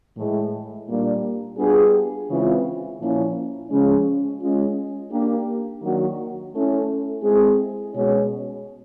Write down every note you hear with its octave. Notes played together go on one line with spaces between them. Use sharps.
A2 E3 G#3
A#2 G3 A#3 D4
G3 B3 D4 F4 G#4
C#3 E3 G#3 C4 F4
A#2 F3 A#3 C#4 E4
C#3 F3 G#3 C#4
G#3 C#4 F4
A#3 D4 G4
D#3 F#3 A#3 D4 F#4
A3 C#4 E4 A4
G#3 C4 E4 G#4
B2 G#3 C#4